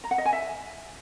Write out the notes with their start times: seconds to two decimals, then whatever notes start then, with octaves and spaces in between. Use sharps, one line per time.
0.04 A#5
0.11 F#5
0.18 D#5
0.25 G#5
0.33 E5